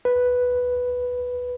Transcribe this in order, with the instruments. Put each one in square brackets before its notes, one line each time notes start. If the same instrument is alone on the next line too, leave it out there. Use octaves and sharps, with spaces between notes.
[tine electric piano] B4